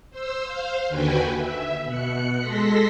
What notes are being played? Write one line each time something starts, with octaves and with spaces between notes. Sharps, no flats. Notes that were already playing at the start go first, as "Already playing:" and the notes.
C5 E6
C5 F5
D#2 D3 F#4 B4 G5 G#5
E5
B2 F#6 C#7
G#3 A4 C6 A#6 B6